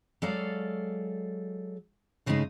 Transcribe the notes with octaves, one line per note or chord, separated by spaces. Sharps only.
F#3 G#3 A4 D5 F5 A#5
G2 C#3 G#3 A3 D4 D#4